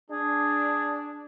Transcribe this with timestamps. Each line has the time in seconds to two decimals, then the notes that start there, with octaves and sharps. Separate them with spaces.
0.11 D4 G#4